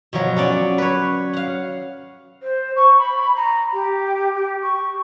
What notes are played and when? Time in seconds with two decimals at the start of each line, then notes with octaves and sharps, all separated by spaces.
0.13 B2 F3 F#3
0.36 F#3 C#4 D5
0.78 B4 C#5
1.33 F5 F#5
2.42 C5
2.76 C#6
2.98 B5
3.36 A#5
3.73 G4
4.34 G4
4.62 C#6